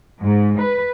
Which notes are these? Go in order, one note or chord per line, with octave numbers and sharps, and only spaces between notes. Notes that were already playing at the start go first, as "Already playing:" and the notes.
G#2
B4